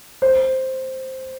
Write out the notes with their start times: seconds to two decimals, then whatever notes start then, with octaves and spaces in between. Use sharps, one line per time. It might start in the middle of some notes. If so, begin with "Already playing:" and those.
0.22 C5